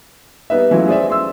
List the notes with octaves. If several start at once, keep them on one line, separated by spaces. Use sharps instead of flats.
G3 B3 D#4 B4 E5
E3 F#3 A3 C#4 E4 F4
G#4 C5 D5 E5
C6 E6